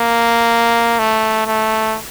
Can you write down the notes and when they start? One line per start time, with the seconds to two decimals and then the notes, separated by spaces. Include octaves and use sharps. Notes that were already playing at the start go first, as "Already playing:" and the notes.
Already playing: A#3
0.99 A3
1.47 A3